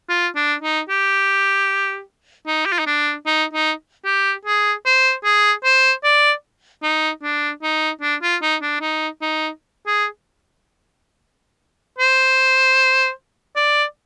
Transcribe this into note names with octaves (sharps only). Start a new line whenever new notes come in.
F4
D4
D#4
G4
D#4
G4
F4
D#4
D4
D#4
D#4
G4
G#4
C5
G#4
C5
D5
D#4
D4
D#4
D4
F4
D#4
D4
D#4
D#4
G#4
C5
D5